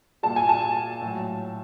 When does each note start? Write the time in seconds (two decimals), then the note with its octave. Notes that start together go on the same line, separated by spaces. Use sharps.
0.23 A#2 G3 A5
0.36 G#5
0.49 A5
1.01 A2 F#3